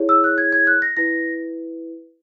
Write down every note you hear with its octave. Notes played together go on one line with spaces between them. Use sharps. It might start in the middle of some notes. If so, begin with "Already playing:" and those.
Already playing: E4 G#4 C#5
E6
F#6
G#6
G#6
F#6
A#6
E4 B4 A#6